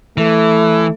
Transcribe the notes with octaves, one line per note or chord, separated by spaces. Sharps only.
E3 A3